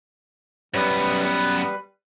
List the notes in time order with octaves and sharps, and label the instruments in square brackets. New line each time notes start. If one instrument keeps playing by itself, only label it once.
[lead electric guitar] F#2 B3 [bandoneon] G3 B4